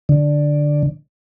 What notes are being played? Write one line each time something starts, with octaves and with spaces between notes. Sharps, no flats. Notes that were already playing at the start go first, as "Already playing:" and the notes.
D3